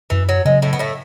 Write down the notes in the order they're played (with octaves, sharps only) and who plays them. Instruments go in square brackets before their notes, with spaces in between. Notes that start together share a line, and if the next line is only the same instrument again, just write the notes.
[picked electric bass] F#2 [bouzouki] E3
[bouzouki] F#3
[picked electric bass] C#3 F#3 [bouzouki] G#3
[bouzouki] A2 A3
B3
A2 A3